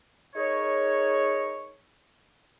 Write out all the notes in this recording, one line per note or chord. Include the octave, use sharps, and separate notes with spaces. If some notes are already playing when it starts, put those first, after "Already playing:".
D#4 G#4 A#4 C#5